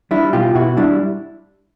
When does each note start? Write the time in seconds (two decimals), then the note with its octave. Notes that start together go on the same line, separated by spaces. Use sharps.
0.11 G3 D4 E4
0.33 B2 F4 G4
0.55 B2 E4 F#4
0.77 G3 D4 E4